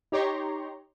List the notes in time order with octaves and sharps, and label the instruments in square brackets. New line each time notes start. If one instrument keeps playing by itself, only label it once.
[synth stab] D#4 G4 C#5 A#5 C6 C#6